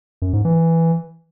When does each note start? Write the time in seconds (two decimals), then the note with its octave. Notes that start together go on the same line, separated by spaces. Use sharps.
0.22 F#2
0.33 G#2
0.45 E3